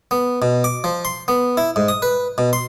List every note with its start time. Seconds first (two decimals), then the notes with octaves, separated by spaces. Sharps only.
0.11 B3
0.42 B2
0.64 D6
0.84 F3
1.05 C6
1.28 B3
1.57 E4
1.76 G#2
1.88 D#6
2.02 B4
2.38 B2
2.53 C6